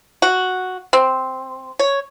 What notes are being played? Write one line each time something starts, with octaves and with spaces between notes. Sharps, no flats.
F#4
C4
C#5